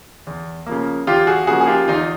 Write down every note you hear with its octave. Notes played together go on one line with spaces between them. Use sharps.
E2
C#3 F3 A#3
E2 F4 G4
F#4 G#4
C#3 F3 A#3 F#4 G#4
G#4
F4 G4
E2 D#4 F4